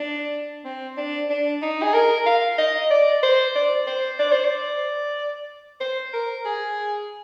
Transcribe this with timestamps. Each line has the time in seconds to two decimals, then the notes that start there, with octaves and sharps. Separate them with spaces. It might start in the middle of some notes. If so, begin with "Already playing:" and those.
Already playing: D4
0.65 C4
0.98 D4
1.30 D4
1.62 D#4
1.83 G#4
1.94 A#4
2.26 F5
2.58 D#5
2.91 D5
3.23 C5
3.56 D5
3.87 C5
4.20 D5
4.32 C5
4.45 D5
5.81 C5
6.14 A#4
6.45 G#4